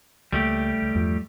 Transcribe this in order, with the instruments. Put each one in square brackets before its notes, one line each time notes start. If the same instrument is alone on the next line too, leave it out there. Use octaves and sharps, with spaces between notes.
[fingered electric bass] C#2 A#3 [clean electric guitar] G3 A3 G4
[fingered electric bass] C#2
E2 G2 F3